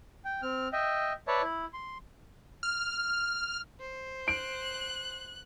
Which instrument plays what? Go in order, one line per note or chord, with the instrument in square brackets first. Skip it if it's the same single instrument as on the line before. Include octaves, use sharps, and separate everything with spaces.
[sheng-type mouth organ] G5
C4 F6
D#5 E5 G5
B4 C#5 D5 E5 A5
E4
C6
[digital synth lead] F6
[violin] C5
[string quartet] F#6 [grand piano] D7